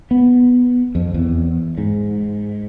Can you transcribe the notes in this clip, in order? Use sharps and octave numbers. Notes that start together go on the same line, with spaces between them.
B3
F2
E2
G#2